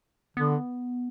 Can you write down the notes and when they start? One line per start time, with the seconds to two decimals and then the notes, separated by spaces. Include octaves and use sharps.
0.37 D3 B3